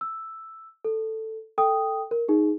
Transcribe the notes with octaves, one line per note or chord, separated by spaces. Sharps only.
E6
A4
A4 G5 D#6
A#4
D#4 G#4